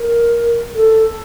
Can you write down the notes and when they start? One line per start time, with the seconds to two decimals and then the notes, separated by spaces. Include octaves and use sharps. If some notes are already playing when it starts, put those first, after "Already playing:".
Already playing: A#4
0.75 A4